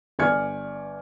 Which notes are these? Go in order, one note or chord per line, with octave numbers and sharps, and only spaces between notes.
G1 D5 G#5 F6 G#6 C#7